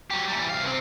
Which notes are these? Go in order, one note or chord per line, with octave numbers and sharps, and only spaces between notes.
F#3 G4
E3 G3
C2 F5
C3 C4